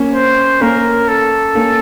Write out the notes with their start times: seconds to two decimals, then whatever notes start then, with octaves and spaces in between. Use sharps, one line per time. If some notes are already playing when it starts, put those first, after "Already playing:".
Already playing: A#3 C#4
0.14 C5
0.60 A#3 C#4 A#4
1.08 A4
1.55 A#3 C#4